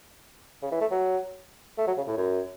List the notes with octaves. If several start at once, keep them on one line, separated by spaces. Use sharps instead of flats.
C#3
E3
A3
F#3
A3
F#3
C#3
A2
F#2